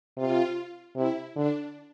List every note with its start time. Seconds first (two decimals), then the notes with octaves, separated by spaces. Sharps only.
0.17 C3 F4
0.96 C3 E4
1.36 D3 D4